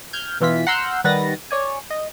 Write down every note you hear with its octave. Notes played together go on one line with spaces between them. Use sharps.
F6 G6 G#6
B2 E3 F4 B6
F#5 A#5 C6 E6 F6 G6
D#3 G3 B4 F#5 A6 A#6
C#5 D5 G#5
D#5